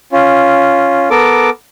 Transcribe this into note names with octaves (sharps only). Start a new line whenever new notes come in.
C#4 F4
B3 A4 A#4 D6